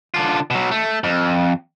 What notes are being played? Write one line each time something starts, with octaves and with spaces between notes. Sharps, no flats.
D3 F4
B2 F#3
A3
F2